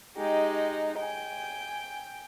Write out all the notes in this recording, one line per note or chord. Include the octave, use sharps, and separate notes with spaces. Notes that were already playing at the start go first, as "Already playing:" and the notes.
G#3 D#4 G4
G5 G#5